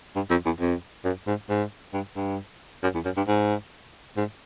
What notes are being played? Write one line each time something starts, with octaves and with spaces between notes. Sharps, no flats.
G2
F2
E2
F2
F#2
G#2
G#2
G2
G2
F#2
E2
F#2
G2
G#2
G#2